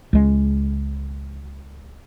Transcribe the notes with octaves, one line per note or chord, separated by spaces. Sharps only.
C#2 G#3